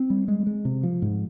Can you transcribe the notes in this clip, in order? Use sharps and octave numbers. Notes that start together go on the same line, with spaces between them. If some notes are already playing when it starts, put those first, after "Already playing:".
Already playing: C4
G3
G#3
G#3
C3
F3
G#2